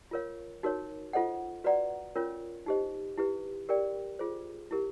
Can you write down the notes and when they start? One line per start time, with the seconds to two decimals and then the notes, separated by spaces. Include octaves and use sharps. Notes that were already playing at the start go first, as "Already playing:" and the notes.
0.11 F4 A#4 C#5 F5
0.63 D#4 F#4 A#4 C#5
1.13 F4 A4 C5 D#5 F#5
1.64 F#4 B4 D5 F#5 A#5
2.16 C#4 F4 A#4 C#5
2.66 D#4 G4 C5 D#5
3.18 E4 G4 B4
3.69 G4 A#4 D5 G5
4.19 F4 G#4 C5
4.71 E4 G4 A#4